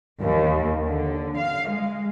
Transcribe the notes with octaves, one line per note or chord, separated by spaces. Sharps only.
D#2
D3
F5
G#3